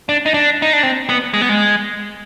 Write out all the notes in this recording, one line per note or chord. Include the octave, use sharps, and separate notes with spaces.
D4
D#4
D4
D#4
D4
C4
B3
G#3
B3
G#3